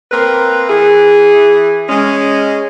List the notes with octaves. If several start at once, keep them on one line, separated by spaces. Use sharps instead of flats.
A#3 C4 A#4 B4
E3 E4 G#4
G#3 C#4